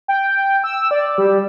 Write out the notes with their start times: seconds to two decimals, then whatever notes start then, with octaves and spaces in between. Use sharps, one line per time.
0.08 G5
0.64 E6
0.91 D5
1.18 G3